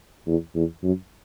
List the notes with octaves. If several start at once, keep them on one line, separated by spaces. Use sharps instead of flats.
E2
E2
F#2